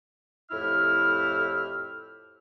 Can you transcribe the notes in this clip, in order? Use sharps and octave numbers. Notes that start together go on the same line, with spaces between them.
F2 A2 E4 G4 E5 F6